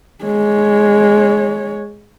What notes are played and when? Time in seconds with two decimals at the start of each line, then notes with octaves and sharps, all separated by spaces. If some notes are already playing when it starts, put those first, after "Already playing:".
0.24 G#3 C#5